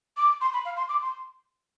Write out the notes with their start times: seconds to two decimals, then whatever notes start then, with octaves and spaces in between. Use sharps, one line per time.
0.17 D6
0.41 C6
0.53 B5
0.65 F5
0.77 C6
0.89 D6
1.02 C6